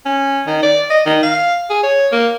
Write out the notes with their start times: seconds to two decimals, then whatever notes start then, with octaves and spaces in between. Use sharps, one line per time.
0.05 C#4
0.47 D#3
0.63 D5
0.90 D#5
1.06 D#3
1.23 F5
1.70 G#4
1.83 C#5
2.12 A#3